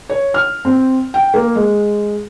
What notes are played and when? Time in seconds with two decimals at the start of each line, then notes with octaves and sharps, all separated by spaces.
0.09 C#5
0.34 F6
0.65 C4
1.14 G5
1.34 A#3
1.55 G#3